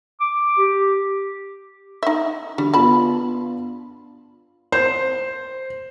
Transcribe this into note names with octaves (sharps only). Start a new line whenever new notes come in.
D6
G4
D#4 E5
D3 G3
B3 D4 F4 A5 B5
C5